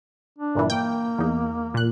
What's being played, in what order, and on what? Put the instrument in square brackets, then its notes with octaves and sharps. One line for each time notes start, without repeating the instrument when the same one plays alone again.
[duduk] D4
[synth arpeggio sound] G1 A#2 E3
[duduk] A#3 [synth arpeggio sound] G5
[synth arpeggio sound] E2 D#4
A#2 F#6